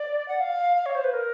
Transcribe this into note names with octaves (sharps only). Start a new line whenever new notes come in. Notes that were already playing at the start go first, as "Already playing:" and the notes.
Already playing: D5
F#5
F5
F5
C#5
C5
B4
A#4